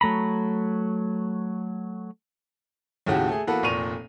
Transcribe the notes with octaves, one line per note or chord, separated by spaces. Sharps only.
F#3 A3 A#5 B5
D#2 A2 C#3 F#4 G4
A3 G#4
E3 A#3 B3 F#4 A4 B4
F1 A#2 C#6 D#7 F7